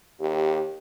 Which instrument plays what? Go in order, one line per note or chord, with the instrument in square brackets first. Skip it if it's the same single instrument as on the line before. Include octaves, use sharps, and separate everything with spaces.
[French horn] D#2 [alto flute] G4